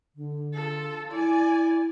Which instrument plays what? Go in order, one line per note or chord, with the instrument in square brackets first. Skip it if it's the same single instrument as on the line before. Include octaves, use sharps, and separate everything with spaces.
[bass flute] D3
[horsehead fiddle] F4 A4
[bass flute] E4 [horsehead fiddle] D5 G#5